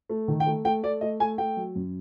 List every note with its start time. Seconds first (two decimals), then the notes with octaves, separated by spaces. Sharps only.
0.09 A3
0.28 D#3
0.40 G5
0.46 A3
0.65 A3 G5
0.83 A3 D5
1.01 A3 D#5
1.20 A3 G#5
1.38 A3 G5
1.57 F#3
1.75 F#2